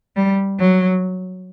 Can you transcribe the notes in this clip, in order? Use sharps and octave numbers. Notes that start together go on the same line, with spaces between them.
G3
F#3